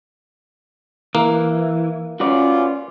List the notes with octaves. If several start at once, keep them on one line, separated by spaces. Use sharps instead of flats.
E3 A#3
C#4 F4 F#4 B4 D5